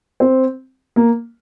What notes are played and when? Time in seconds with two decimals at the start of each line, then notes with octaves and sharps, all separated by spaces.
0.20 C4
0.96 A#3